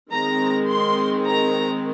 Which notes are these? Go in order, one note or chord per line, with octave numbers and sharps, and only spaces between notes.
D#3 G#3 C4 A#5
C6
A#5